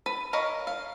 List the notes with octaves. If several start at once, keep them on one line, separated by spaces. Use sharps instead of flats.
B4
A#4 C#5 D#5 F5 B5
F5